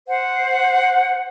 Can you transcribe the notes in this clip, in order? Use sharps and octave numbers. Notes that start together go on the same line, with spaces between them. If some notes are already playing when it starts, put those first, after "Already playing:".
C5 F#5